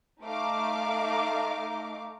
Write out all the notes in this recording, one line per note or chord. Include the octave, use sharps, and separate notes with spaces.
A3 D#4 F5 D6